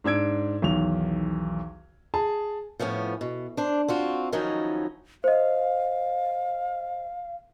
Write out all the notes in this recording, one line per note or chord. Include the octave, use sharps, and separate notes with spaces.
G#2 D4 E6 G#6 D7
B1 E2 D#3 F7
G#4 A5
A2 F3 B3 C#4
B2
D4 C5
C4 F4 F#4
D#3 F3 F#3 C#4 D#4 E4
C5 D#5 F5